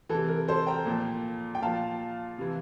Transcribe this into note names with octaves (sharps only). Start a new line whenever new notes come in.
C3 E3 A4
A#4
A4 C5
G5 A#5
A#2 F3
G5
A#2 F3 F5 A5
C3 E3